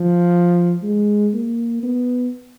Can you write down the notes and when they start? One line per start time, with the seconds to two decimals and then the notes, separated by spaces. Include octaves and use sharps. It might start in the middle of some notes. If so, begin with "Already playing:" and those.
Already playing: F3
0.83 G#3
1.34 A#3
1.83 B3